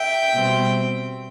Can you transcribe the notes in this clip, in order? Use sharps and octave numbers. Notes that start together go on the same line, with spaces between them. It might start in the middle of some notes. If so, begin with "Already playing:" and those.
Already playing: E5 G5
B2 G3 C4